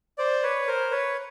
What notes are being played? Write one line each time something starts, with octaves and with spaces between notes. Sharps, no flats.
C5 D5
B4 C#5
A#4 C5
B4 C#5